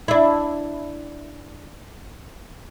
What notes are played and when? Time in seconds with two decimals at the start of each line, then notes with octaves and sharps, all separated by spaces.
0.08 D4 E4